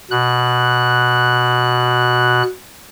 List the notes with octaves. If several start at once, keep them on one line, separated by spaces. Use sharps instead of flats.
B2 F#6